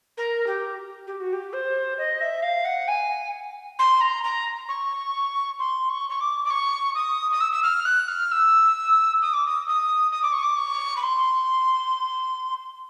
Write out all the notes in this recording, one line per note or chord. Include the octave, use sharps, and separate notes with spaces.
A#4
G4
G4
F#4
G4
C5
D#5
E5
F5
F#5
G#5
C6
A#5
A#5
C#6
C6
C#6
C#6
D6
D6
C#6
D#6
D#6
E6
E6
F6
F#6
F6
E6
D#6
D6
D#6
D#6
D#6
D6
C#6
D6
C#6
B5
C6